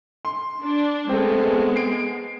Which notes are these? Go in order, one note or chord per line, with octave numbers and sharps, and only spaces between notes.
C6
D4
G#3 A3 B3 C4
C7 D7